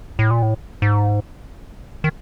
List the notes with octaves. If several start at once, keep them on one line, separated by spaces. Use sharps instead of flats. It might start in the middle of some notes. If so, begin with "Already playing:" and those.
A2
A#2
A2
G#2
D#3